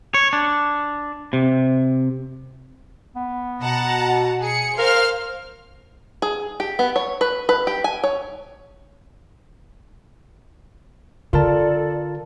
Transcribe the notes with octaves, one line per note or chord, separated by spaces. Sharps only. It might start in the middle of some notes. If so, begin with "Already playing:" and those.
C#5
D4
C3
B3
B2 F#5 A5 A#5
G#4 C#7
A#4 C5 F5 F6
G#4
G4
B3
C#5
B4
B4
G4
G#5
C#5
D3 F4 A4 A#4 D5 A5